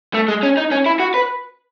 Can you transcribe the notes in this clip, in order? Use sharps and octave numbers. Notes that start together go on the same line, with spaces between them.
A3
G#3
C#4
D#4
C#4
E4
F#4
B4